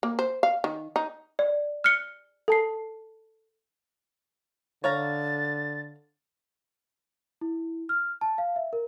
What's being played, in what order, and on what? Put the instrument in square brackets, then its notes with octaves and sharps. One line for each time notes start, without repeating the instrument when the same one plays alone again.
[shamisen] A#3
C5
F5
D#3
D#4
[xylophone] D5
F6 F#6 C#7 G7
A4 A5 C7
[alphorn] D3 [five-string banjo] C#5 F5 A#5 [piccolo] A6
[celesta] E4
F6
A5
F5
E5
A#4